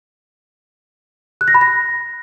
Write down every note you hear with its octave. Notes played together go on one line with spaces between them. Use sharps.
F#6
A#6
B5
A#6